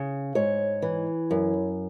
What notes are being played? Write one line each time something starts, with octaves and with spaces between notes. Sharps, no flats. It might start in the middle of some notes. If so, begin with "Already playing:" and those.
Already playing: C#3
G#2 C#5
E3
F#2